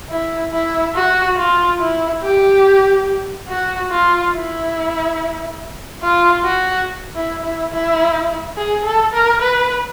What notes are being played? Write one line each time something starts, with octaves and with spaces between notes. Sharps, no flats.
E4
E4
F#4
F4
E4
G4
F#4
F4
E4
F4
F#4
E4
E4
E4
G#4
A4
A#4
B4